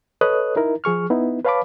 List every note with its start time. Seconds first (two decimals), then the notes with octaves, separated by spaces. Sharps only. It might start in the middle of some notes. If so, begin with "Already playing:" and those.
0.21 A4 B4 C#5 D#5 D#6 F#6
0.56 D#4 E4 A#4
0.84 F3 G#4 C#6 F6
1.10 B3 D#4 E4
1.44 B4 C#5 F5 A5 B5 D6